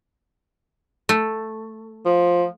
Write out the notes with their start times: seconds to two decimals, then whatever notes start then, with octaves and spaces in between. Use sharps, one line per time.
1.09 A3
2.05 F3